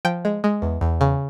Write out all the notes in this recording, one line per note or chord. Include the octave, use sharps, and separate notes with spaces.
F3 G5
G#3
G#3
E2
E2
C#3